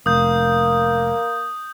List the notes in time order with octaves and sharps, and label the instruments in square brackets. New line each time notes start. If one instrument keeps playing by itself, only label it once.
[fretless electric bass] F1 [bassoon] A#3 [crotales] D#6 G6